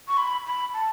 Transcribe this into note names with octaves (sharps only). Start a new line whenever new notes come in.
C#6
B5
B5
A5